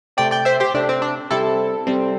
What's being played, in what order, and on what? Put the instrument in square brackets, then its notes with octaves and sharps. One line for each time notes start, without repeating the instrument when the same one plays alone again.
[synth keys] C3 A3 C4 D5 G5
D5 G5
C5 E5
G4 C5
C3 A3 C4 D4
C4
D4
C3 G3 C4 E4 A4
C3 G3 C4